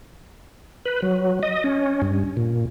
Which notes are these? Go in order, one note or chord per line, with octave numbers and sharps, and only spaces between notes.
B4
F#3
D#5
C#4
G2
A#2